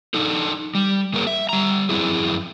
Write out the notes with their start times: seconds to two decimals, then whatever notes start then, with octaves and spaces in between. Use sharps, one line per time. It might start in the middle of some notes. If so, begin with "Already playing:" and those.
0.14 D4 D#4 A4
0.75 G3
1.13 G3 A#3 G#4 A#4 B4 C#5
1.27 E5
1.49 G3 A#5
1.89 F#2 C3 F3 C4 E4 G#4